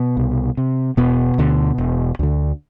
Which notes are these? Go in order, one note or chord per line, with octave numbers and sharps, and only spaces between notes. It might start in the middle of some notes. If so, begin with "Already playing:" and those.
Already playing: B2 B3
C2
C3
E1 B2 B3
D2 D3
E1
D2 D3